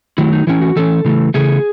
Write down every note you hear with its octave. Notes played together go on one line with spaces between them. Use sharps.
D#3 F#3 A3 E4
D#4
E3 A3 C#4 E4
F#4
E3 A3 C#4 A4
C#3 E3 A3
C#3 E3 A3 G#4